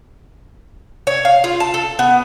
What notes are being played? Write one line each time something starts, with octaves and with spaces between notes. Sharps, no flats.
C#5
F5
F4
A5
A4
B3